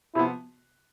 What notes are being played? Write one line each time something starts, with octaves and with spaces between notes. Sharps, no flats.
C3 F3 B3 E4